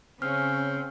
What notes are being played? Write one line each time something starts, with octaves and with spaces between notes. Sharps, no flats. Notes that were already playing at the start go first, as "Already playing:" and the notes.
C#3 C4 C#4 F6